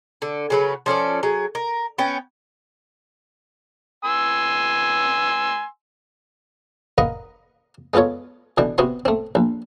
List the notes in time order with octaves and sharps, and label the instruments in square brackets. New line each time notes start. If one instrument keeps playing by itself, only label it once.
[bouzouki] D3
C#3 F#3 B4
F3 C#4 A4 D5
F#3 G#4
A#4
B3 C#4 G5
[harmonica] G#5 C6 E6
[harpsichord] A#4 B4 D#5 F5 F#5 A#5
G#3 B3 F4 A4 C#5
B2 D3 E3 G5
C3 B3 F#4 F#5 C6
A3 C4
A#1